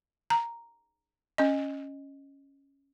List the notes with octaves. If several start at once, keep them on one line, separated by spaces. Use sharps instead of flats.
A#5
C#4 D#5